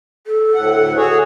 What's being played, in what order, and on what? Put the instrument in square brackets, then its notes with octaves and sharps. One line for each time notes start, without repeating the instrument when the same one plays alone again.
[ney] A4
[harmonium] D2 A2 F#5
F#4 G#4 C#5